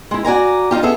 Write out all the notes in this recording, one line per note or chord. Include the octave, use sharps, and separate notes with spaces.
G#3 E4
F#4 D5 G#5 A#5
G3 D#4 F4 G4
B3 G#4 A4 E5